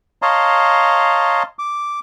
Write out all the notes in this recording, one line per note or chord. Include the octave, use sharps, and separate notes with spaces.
C#5 D#5 F5 A5 A#5 C6
D6